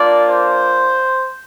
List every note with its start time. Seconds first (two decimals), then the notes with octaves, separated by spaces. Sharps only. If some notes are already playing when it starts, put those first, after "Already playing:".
Already playing: A#3 D4 F4 D5
0.28 C5